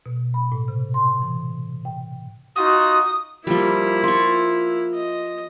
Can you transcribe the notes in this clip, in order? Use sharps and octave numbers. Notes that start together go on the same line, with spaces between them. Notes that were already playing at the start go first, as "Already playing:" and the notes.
B2
B5
A2
C3
C6
E3
G5
D#4 F4 F#4 D#6
F3 G3 A#3 E4
F4 C#6
D#5